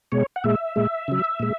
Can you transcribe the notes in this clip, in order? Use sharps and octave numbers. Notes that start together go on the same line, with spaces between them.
B2 G#3 C#5
F#5
A#2 G#3 E5
A#2 G#3
C#3 F#3
A#2 G#3